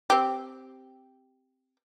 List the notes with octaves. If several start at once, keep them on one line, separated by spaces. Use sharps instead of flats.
C4 G4